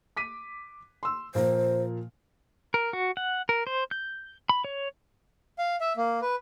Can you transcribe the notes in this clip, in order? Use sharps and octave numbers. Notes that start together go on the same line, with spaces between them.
D6 B6 D#7
C6 E6
A#2 F3 A#3 C5
A#4
F#4
F#5
A#4
C5
G6
B5
C#5
F5
E5
A#3
B4